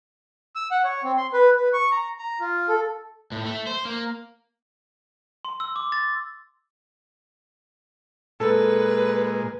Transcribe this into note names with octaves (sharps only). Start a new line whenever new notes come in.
E6
F#5
C#5
C4
C6
B4
B4
C#6
A#5
A#5
F4
A4
A2
A3
C5
A#3
C6
E6
D6
A6
A#2 G#3 A4 B4